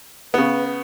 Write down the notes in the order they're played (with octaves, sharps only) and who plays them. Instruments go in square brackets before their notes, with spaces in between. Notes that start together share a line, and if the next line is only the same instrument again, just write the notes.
[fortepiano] C#3 B3 [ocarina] B4